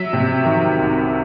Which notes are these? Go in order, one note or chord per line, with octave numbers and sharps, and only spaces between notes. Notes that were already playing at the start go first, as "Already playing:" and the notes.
Already playing: F#3 E5
C3
D#3
C2